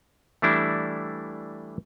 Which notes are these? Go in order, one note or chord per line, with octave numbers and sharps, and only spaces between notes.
E3 G3 A3 D4 E4